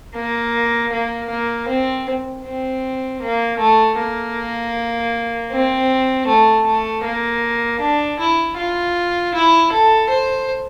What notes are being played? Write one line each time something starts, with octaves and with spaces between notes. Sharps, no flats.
A#3
A#3
A#3
C4
C4
A#3
A3
A#3
C4
A3
A3
A#3
D4
E4
F4
E4
A4
C5